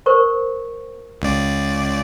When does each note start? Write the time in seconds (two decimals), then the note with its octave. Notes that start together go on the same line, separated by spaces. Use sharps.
0.06 A#4 C5 C#6
1.22 C#2 D5